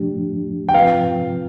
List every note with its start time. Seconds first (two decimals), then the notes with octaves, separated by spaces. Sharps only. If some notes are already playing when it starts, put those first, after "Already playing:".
Already playing: F3 A3 D4 G4
0.69 G5
0.74 F3 C4 F4 B4 F5